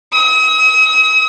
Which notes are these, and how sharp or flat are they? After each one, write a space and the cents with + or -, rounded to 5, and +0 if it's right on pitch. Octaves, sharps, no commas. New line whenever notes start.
D#6 +45